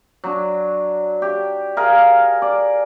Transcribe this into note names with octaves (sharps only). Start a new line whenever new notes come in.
F#3 D4
G4
G#4 A#4 F5
D5